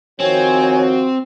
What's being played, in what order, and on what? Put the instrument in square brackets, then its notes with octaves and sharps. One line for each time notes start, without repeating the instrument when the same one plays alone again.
[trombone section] D#3 F3 F#4 [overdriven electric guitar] C4 [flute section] C#5 G#5